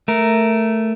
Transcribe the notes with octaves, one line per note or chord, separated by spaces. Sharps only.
A3 A#4